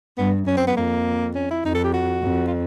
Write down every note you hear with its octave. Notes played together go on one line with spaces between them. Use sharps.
G2 B3
F#2 C#4
C4
B3
F2 A#3
C#4
E4
F2 D#4
A4
G4
F#4
F2
F4